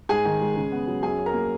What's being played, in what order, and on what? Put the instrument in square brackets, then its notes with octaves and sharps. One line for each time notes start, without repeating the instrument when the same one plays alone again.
[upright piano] G#2 G#4 G#5
D#3
G#3
C#3
B3
F#3
F#2 G#4 G#5
C#4
A#4 A#5
A#3